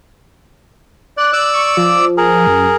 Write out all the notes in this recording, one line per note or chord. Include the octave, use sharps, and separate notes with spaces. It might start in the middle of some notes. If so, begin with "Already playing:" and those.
D5 F#6
D5 D6 E6
C#6
F3
G#4 A#4
F#2